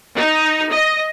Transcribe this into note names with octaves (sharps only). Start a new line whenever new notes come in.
D#4
D#5